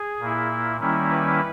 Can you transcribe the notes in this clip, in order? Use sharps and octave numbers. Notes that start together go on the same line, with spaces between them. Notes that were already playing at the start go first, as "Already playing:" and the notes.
Already playing: G#4
A#2 A#3 E4
D#3 G3 A#3 C#4 E4
B4